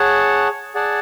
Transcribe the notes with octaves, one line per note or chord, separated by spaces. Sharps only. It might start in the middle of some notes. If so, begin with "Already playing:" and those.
Already playing: G#4 C#5 F#5 A5
G#4 D5 F#5 A5